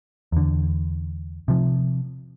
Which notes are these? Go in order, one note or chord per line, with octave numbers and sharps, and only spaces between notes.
E2 D3
C3 F3